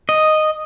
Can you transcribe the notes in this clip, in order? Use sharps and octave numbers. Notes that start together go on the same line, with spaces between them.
D#5